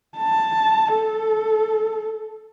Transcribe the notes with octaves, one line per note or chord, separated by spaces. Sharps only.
A5
A4